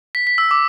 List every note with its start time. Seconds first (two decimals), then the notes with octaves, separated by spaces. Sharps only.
0.15 B6
0.27 B6
0.38 E6
0.51 D6